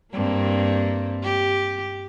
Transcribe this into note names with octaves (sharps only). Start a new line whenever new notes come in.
G2 A#3 C4
G4